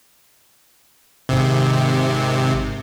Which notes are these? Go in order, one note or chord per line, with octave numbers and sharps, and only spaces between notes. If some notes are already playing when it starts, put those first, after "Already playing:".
G#1 C3